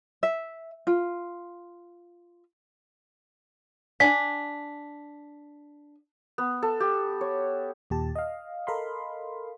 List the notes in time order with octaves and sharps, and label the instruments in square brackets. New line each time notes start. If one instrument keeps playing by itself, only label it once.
[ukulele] E5
F4
[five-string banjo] D4 G#5 [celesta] B6
[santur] B3
A4
G4
C#5
[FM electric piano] D#2 A#2 G4 A5
D#5 F5
A4 A#4 D#5 F5 B5 C6